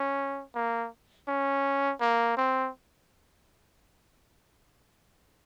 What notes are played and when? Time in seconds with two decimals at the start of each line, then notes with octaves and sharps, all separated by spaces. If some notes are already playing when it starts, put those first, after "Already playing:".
Already playing: C#4
0.55 A#3
1.28 C#4
2.00 A#3
2.37 C4